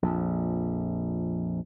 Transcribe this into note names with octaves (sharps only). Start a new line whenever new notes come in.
A#1 F2